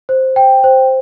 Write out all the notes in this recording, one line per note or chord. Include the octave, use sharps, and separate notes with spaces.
C5
G5
C5